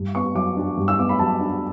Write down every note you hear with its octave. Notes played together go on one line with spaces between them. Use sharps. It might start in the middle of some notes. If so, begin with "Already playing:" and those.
Already playing: G2
B3 C#6
F#3 D6
D4
G2
E6
B3 D6
B5
F#3 A5
D4